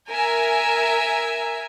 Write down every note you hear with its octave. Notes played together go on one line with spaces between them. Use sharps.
A#4 E5 G#5